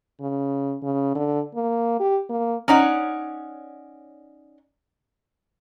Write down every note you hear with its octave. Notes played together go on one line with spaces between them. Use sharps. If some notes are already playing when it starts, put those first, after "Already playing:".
C#3
C#3
D3
A#3
G4
A#3
C#4 D#4 C#5 D5 F#5